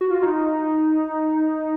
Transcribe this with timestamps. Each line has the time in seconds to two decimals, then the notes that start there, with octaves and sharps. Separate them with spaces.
0.01 F#4
0.11 F4
0.23 D#4